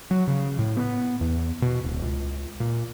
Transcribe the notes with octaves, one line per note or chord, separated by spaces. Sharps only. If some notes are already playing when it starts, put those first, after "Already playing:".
F#3
C#3
A2
B3
E2
B2
D1
C#2
A#2